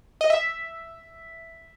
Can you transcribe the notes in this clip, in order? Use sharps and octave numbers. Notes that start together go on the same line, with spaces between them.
D#5
E5